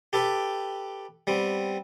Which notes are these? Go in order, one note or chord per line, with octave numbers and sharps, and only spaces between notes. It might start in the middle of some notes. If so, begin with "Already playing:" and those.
G4 A4 B4 G5
G3 B3 C4